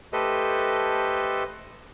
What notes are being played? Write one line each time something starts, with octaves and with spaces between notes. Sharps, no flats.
A3 G4 A4 B4 C5 D#5